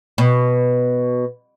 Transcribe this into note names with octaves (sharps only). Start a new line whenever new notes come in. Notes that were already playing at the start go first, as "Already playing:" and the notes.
B2